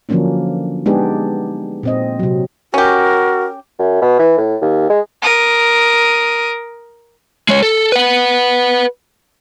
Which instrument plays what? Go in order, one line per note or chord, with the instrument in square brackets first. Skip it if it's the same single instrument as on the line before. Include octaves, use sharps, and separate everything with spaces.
[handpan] D3 F3 F#3 A#3 C#4 D4
G#3 B3 D4 D#4 G4 G#4
A#2 C4 D#5
C3 F#3
[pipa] C#4 G4 [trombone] F#4 [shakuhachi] A#4
[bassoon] F#2
B2
E3
A2
D#2
G#3
[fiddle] A#4 D#6
[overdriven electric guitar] G#3 C#5
A4
B4 F#5